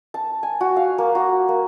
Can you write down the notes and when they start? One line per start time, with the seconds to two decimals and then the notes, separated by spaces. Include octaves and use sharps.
0.14 A5
0.43 G#5
0.61 F#4
0.76 F5
0.98 A#3
1.15 F#4
1.49 A#3